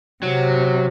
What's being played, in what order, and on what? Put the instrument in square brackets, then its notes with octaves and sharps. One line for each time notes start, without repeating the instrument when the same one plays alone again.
[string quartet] C3 [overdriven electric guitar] F#3